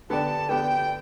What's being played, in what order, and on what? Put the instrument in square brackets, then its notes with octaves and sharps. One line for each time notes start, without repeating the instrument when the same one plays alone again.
[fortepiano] D3 B3 G4 D5 [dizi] A5
[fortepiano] D3 B3 G4 D5 [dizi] G5